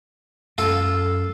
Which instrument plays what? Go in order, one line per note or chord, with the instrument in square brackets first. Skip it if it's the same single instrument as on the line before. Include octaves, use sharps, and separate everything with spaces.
[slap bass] F#2 [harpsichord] F4 A4